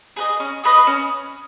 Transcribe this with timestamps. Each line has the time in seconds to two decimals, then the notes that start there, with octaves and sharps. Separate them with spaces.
0.16 G#4 B4 D#5
0.40 C#4
0.64 G#4 B4 D#5
0.87 C#4